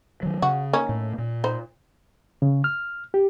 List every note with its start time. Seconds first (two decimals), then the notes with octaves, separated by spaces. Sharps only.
0.23 D#3 F#3
0.42 C#3 F#4
0.73 A#3 C#4 D#4
0.89 A2
1.18 A#2
1.44 D#4 C5
2.42 C#3
2.64 F6
3.14 G4